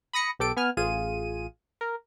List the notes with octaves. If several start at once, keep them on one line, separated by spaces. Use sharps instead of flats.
B5 D#6 A#6 C#7
B1 G4 A4 D7
B3 G#5 F6
A1 F4 G#4 D#7
A#4